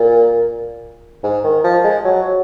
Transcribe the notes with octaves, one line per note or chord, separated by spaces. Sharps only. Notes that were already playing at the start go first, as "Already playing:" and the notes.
Already playing: A#2
G#2
D#3
F3
G#3
F#3